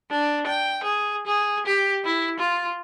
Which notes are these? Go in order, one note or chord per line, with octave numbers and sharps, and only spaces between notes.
D4
G5
G#4
G#4
G4
E4
F4